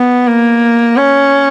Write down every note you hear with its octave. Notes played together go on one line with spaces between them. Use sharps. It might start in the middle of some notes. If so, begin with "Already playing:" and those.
Already playing: B3
A#3
C#4